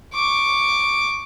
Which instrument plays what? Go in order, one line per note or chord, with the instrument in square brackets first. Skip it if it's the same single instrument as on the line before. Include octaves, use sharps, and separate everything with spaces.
[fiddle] C#6 D6